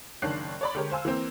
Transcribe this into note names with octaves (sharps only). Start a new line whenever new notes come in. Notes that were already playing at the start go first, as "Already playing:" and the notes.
F#1 D#3 D4 C#5 F#6 C7
C#5 D5 B5
D3 G#3 G4 A#4 C#5
C5 F5 G#5 E6
E3 A#3 C4